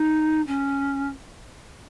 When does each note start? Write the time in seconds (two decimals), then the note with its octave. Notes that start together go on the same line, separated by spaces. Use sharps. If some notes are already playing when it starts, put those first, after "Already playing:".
Already playing: D#4
0.47 C#4